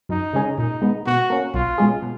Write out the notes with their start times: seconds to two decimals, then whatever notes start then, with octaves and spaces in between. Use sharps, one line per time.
0.09 F#2 D#4
0.33 C#3 G#3 C#4 G#4
0.58 A#2 D#4
0.82 G#3 B3
1.07 B2 F#4
1.30 A#3 C#4
1.54 B1 F4
1.78 B2 G#3 C#4 G#4
2.03 B2